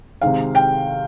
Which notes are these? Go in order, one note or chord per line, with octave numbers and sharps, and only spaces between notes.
C3 D#3 G#3 F5
G5